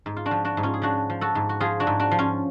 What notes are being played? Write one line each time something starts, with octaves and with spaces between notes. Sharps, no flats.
G#2
F4
D4 F#4
F3
D4 F#4
G#2
C#4 F4
G#4
F3 D4 F#4
F3
F#4 A4
G#2
F#4
F3 F4 G#4
D4 F#4
G#2
D4 F#4
F3
C#4 F4